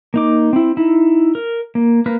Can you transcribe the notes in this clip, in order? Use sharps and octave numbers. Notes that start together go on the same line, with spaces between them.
A#3 D#4 D6
C4 E4
D#4 E4
A#4
A#3
A#3 A#4 B4